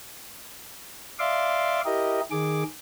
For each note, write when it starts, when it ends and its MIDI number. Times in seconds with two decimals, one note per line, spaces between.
1.19 1.81 74
1.19 1.81 76
1.19 1.81 77
1.19 1.81 84
1.19 1.81 86
1.85 2.21 64
1.85 2.21 67
1.85 2.21 70
1.85 2.21 75
2.31 2.63 51
2.31 2.63 68
2.31 2.63 86